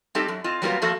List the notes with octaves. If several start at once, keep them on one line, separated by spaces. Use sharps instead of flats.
G3 C4 D#4 G4 A4
F#2
C4 F4 D#5
F#3 G3 A#3 B3 F4 A#4
F2 F3 A3 A#3 F#4 A4